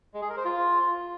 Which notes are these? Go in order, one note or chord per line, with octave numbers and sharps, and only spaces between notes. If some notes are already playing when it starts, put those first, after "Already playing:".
G#3
G#4
A#4
C5
F4